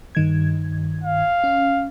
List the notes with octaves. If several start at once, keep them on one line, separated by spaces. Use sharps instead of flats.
G2 D#3 G#6
F5
C#4